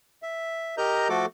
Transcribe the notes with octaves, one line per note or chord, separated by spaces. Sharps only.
E5
G4 A#4 D#5 A#5 G6
F3 A3 F#4 A4 D6